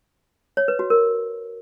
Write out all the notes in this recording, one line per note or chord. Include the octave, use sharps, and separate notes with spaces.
C#5
B4
F#4
A#4